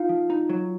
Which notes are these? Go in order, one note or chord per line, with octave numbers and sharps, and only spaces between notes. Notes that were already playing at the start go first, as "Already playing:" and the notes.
Already playing: D#4 F4 F5
F3
D#4
F#3